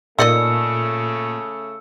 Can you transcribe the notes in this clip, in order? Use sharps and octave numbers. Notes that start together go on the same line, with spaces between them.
A#2 C#3 A3 D#4 D5 D#5 E6 C#7